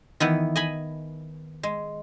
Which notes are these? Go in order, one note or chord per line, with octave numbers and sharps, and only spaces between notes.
D#3 E3 B3
D#5 G#5 B5
G#3